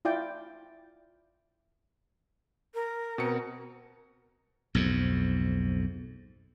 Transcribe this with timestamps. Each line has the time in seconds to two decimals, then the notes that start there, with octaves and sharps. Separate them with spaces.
0.05 E4 F4 D5 G5
2.74 A#4
3.18 B2 C4 C#7
4.75 B1 F2 G#2